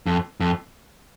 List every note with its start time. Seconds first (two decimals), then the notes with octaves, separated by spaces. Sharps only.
0.06 F2
0.40 F2